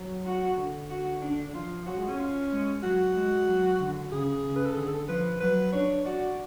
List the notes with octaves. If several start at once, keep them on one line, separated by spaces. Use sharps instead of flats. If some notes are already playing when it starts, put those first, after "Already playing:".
Already playing: F#3
F#4
D3
F#4
D4
D3
F3 F4
F#3 F#4
G#3
C#4
F4
G#3
F#3 F#4
G#3
F#3
D3
C#3 G#4
C#3
B4
A4
D3 G#4
A4
F3 B4
F#3 B4
D4 C#5
F#4 D5